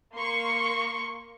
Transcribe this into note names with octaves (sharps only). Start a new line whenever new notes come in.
A#3 C6 C#6